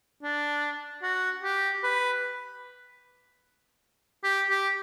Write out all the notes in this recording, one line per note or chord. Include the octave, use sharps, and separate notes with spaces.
D4
F#4
G4
B4
G4
G4